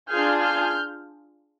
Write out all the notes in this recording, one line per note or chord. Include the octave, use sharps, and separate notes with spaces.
D4 F4 G#4 F6 G6
F6 G6